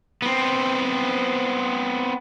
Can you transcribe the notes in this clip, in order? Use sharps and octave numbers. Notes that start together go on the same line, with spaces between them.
B3 C4